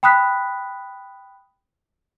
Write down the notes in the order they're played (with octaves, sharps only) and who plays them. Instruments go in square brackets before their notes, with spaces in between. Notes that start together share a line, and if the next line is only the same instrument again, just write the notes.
[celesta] G5 B5 D#6 F#6 B6